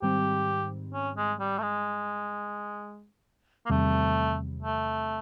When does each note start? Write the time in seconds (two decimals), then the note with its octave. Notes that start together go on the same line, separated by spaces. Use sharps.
0.02 G#2 D#3 G3 C4 G4
0.94 C#4
1.17 G#3
1.39 G3
1.58 A3
1.63 G#3
3.66 A#3
3.70 E2 C3 D#3 G3 A3 C4
4.62 A3